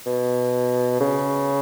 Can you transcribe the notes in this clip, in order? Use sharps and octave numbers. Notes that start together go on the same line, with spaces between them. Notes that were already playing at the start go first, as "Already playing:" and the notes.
B2
C#3